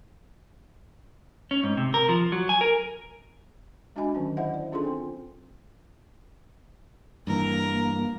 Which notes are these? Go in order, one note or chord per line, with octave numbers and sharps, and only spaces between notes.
C#4
G#2
C3
A#4
F3
F#3
G#5
A#4
G#3 D4 F#4 D#5 G#5 B5
D3 D#3 F#3 C#4
E4 C5 D#5 E5 F#5
D5
C#4 D4 F4 G#4 A4 C6
C4 C5 G5
G2 E3 A#3 A#4